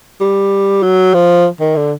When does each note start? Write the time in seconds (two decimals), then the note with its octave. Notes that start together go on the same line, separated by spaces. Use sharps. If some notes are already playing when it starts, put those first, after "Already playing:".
0.20 G3
0.83 F#3
1.14 F3
1.60 D#3
1.76 D3